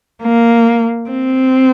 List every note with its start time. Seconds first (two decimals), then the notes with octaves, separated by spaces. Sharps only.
0.23 A#3
1.10 C4